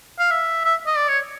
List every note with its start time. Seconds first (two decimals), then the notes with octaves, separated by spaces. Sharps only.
0.19 F5
0.31 E5
0.65 E5
0.87 D#5
0.97 D5
1.08 C#5